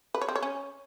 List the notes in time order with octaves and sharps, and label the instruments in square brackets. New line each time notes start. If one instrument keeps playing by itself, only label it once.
[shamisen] B4
C#5
C4
C#5
C#4